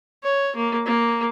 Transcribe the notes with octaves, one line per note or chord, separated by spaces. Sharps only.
C#5
A#3
A#3